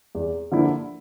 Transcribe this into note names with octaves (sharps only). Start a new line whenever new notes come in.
E2
D3 F3 A#3 E4